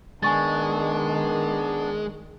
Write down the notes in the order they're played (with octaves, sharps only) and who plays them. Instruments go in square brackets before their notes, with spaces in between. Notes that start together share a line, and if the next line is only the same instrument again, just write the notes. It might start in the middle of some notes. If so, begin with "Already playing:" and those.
[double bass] D#3 [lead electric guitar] G#3 [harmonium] B3 D4 D5 [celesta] G#5 C#6 A6